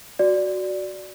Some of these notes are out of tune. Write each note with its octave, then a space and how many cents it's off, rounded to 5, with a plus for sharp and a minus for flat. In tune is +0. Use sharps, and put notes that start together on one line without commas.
F#4 +0 D5 +0